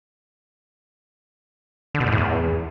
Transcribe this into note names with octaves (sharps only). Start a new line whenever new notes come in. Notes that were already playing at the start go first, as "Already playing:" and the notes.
D3
B2
G#2
A2
E2